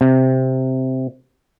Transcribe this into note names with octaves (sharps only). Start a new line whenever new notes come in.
C3